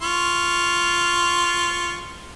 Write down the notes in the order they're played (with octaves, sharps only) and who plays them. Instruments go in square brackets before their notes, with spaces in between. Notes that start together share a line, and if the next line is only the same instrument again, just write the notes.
[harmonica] F4 C#6